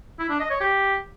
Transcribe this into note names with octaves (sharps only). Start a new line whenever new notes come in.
E4
D4
D#5
C#5
G4